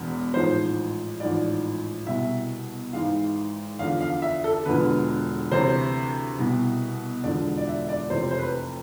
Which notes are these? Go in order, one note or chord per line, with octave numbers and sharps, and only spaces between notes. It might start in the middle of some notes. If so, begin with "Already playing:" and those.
Already playing: E1 E2 B2
A1 G#2 F3 C5
A1 G#2 F3 D5
C2 B2 E5
G#1 G#2 E3 F5
E2 D3 F3 F5
F5
E5
A4
E1 E2 D3 F3 B4
D2 C3 E3 C5
C2 B2
E1 E2 D3 F3 D5
D5
E5
D5
F1 F2 C3 E3 C5
C5
B4